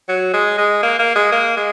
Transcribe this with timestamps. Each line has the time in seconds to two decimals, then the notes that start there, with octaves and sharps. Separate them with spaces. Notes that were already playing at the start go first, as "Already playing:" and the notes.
0.09 F#3
0.33 G#3
0.58 G#3
0.83 A#3
0.99 A#3
1.15 G#3
1.32 A#3
1.57 G#3